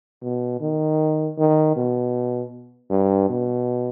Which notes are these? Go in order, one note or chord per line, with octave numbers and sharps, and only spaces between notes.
B2
D#3
D#3
B2
G2
B2